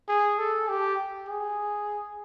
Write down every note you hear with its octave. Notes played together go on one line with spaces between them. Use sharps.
G#4
A4
G4
G#4